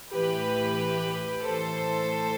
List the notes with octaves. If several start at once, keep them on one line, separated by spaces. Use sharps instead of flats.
A2 E3 G4 B4
A2 E3 A4 C5